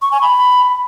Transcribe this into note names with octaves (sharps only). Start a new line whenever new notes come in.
C#6
G#5
B5